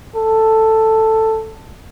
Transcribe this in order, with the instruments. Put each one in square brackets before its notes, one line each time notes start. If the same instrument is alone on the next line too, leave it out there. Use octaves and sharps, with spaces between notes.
[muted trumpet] A4